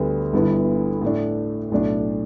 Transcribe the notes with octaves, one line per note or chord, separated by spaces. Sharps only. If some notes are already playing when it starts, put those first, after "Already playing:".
Already playing: D2 D3 G3 B3
G1 G2 D3 B3 E4
A2 A3 D4
B1 A2 A3 D4